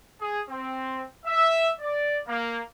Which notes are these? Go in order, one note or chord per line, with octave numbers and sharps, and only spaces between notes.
G#4
C4
E5
D5
A#3